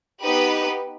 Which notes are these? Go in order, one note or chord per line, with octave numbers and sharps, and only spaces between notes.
B3 D#4 G4 B4